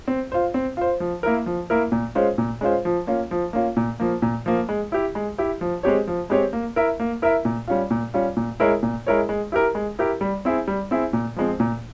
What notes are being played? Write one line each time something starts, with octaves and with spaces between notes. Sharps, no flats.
C4
F4 C5
C4
F4 C5
F3
A#3 E4 A#4
F3
A#3 E4 A#4
A#2
G#3 C#4 F4 C5
A#2
G#3 C#4 F4 C5
F3
A#3 C#4 F4
F3
A#3 C#4 F4
A#2
F3 A#3
A#2
F3 A#3
G#3
E4 G4
G#3
E4 G4
F3
G#3 C4 G4 C#5
F3
G#3 C4 G4 C#5
A#3
E4 A#4 E5
A#3
E4 A#4 E5
A#2
G3 C#4 F4
A#2
G3 C#4 F4
A#2
G#3 E4 A#4 C#5
A#2
G#3 E4 A#4 C#5
G#3
E4 G4 A#4
G#3
E4 G4 A#4
G3
C4 E4 G#4
G3
C4 E4 G#4
A#2
F3 G#3 C4
A#2